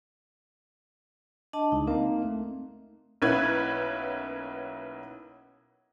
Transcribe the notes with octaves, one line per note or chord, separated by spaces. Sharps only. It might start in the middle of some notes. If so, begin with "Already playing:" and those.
D4 D#5 A5
C#2 D#4
A#3 C4 D#4
A3
B1 A#3 C#4 E4 B4 G#6